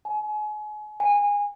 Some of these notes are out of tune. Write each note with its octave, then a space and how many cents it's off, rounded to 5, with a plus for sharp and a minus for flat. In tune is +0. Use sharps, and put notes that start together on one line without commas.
G#5 +35
G#5 -20